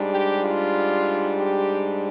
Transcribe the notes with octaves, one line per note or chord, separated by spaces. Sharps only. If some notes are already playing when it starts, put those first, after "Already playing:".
Already playing: G#2 G3 D4
G4
F4
G4